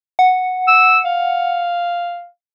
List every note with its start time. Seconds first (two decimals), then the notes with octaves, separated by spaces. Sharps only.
0.19 F#5
0.67 E6
1.05 F5